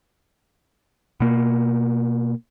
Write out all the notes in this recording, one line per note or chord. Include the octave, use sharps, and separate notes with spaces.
B2 A#3